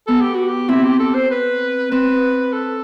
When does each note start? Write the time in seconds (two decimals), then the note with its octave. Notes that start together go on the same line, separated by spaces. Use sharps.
0.07 B3 A4
0.21 G4
0.35 F#4
0.48 G4
0.69 C4 E4
0.84 G4
1.00 A4
1.15 C5
1.31 B4
1.91 C4 B4
2.53 A4